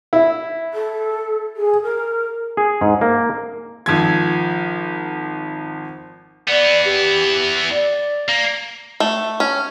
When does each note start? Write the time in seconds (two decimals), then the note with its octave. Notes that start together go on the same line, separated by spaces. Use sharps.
0.13 E4
0.73 A4
1.56 G#4
1.82 A#4
2.57 G#4
2.81 G#2
3.01 A#3
3.86 G#1 F3 G#6
6.48 E3 B3 D5
6.84 G4
7.71 D5
8.29 A#3
9.00 A3
9.40 C#4